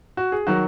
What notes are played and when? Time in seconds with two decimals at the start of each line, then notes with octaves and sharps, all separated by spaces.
0.17 F#4
0.32 G#4
0.47 D#3 F#3 F#4